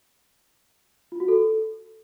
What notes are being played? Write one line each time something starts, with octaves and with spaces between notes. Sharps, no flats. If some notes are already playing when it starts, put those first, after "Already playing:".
F4
F#4
A4